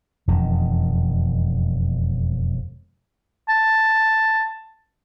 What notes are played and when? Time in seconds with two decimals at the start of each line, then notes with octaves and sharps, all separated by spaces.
0.28 E1 F2 D#3
3.49 A5